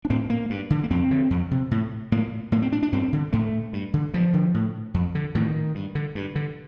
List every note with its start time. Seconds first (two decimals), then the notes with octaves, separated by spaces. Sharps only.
0.05 D4
0.10 A2 C4
0.30 A#3
0.50 G2
0.70 D3
0.83 A#3
0.90 F2 C4
1.11 D3
1.30 F2
1.51 C3
1.71 A2
2.12 A2 A#3
2.52 A2 A#3
2.62 C4
2.72 D4
2.83 D4
2.92 G2 C4
3.13 D3
3.33 A2 A3
3.73 G2
3.94 D3
4.14 G2 F3
4.34 D3
4.54 A2
4.94 F2
5.15 D3
5.35 A2 D#3
5.75 G2
5.95 D3
6.15 G2
6.36 D3